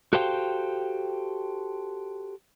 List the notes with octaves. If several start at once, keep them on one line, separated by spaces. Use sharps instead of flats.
F#4 G4 A4 C5 F5 G5